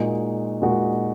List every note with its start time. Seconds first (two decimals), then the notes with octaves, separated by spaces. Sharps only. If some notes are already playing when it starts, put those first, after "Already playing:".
Already playing: A#2 G#3 D#4 F#4
0.62 A#2 G#3 D#4 F#4